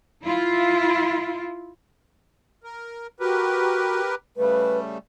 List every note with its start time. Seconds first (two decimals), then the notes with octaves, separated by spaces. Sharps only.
0.24 E4 F4
2.64 A#4
3.20 F#4 G4 A#4 B4
4.37 C#3 G3 A3 B4